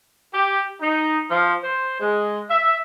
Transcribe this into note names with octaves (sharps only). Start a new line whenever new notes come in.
G4
D#4
F3
C5
G#3
E5